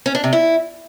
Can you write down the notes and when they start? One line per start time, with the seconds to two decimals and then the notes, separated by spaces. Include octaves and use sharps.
0.06 C#4
0.15 D4
0.24 C3
0.33 E4